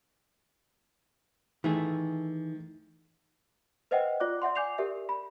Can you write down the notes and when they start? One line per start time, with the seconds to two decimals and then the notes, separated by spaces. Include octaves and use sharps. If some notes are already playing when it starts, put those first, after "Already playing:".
1.64 D#3 E3 A3 G#4
3.91 B4 C5 D#5 E5 F#5 G5
4.20 F4 D5 D6 F#6
4.42 D5 E5 F#5 C6
4.56 G#5 D6 G6 C7 F7
4.78 G4 A#4 D5 E5
5.09 B5